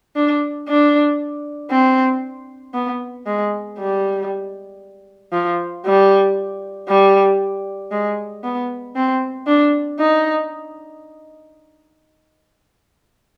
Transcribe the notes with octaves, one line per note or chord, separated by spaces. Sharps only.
D4
D4
C4
B3
G#3
G3
F3
G3
G3
G#3
B3
C4
D4
D#4